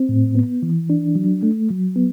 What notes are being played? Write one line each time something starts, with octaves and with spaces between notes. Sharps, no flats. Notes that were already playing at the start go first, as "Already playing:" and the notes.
Already playing: C4
A2
B3
E3
D4
F#3
A3
F#3
B3